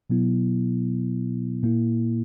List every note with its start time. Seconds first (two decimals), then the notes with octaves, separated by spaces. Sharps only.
0.10 B2 F#3 B3 E4
1.63 A#2 A#3 E4